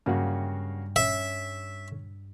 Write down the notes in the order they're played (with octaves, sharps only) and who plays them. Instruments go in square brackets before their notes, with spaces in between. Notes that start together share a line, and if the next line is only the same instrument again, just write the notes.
[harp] G2 G3 [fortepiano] C#3 A#3 F#4
[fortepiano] C#4 [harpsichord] E5